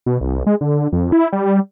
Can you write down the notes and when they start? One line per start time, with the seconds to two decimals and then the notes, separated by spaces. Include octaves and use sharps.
0.06 B2
0.21 C2
0.46 G#3
0.61 D3
0.92 F2
1.12 E4
1.32 G3